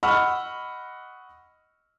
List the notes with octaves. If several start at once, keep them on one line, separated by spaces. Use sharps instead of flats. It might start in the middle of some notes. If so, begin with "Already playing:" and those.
D#5 F#5 B5 C#6 E6 F6